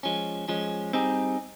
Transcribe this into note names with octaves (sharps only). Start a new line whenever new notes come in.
F3 G#3 C#4
F3 G#3 C#4
G3 C4 D#4 G#4